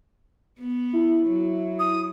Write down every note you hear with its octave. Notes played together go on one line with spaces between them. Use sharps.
B3
E4
F#3
D#6